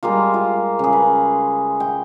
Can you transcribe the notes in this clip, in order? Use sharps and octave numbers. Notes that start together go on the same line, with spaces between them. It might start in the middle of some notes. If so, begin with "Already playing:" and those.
G3 G#3 A#3 F4
F4
C#3 G#4
B4
G5